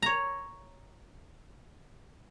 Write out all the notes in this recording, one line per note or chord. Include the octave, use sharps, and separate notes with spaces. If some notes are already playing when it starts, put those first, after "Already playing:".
C#5 A#5